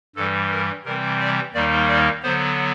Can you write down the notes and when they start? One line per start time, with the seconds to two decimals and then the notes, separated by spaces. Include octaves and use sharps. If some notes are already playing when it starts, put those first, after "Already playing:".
0.15 G2 E3 G3 A4
0.51 A#4
0.85 C3 E3 G3 C4 A#4
1.20 D5
1.54 D#2 D#3 G3 A#3 D#4 D5
1.88 D5
2.23 D3 F#3 B3 C5